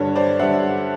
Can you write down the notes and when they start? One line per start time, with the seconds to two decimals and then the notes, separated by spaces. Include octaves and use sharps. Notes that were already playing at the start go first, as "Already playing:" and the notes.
Already playing: G2 D3 G3 C#5
0.16 C5 D5
0.39 G2 D3 G3 E5 F#5